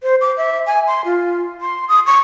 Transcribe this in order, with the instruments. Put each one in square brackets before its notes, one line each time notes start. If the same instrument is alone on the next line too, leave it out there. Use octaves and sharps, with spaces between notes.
[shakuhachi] C5
D6
E5
G#5
C6
F4
C6
D#6
C#6